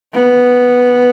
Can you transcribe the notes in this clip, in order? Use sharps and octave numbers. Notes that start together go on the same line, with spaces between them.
B3